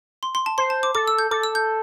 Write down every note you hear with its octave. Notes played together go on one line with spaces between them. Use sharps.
C6
C6
A5
C5 C6
A5
D6
A4 D6
E6
G6
A4 D6
E6
G6